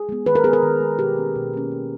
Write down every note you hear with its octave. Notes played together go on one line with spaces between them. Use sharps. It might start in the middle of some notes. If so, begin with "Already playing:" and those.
Already playing: G#4
G#3 B3
D#3 B4
A#4
G#3 B3 G#4
A#4
D#3
G#3 B3
B2 G4
A#3 C#4
B2
A#3 C#4
B2